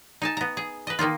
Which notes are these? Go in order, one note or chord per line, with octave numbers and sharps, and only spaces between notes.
D#4 G#5 A5
B3 A#5
G#4
B4 D#5
D#3 A#3 D#4 F4